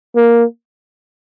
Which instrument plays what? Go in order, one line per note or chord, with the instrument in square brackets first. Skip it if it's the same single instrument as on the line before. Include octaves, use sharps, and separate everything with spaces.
[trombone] A#3